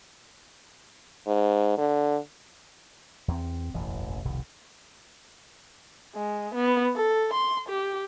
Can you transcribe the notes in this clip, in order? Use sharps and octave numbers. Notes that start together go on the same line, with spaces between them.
G#2
D3
E2 C4
E1 A1 F#2 E3
F1 C2 B2 D#3
G#3
B3
A4
C6
G4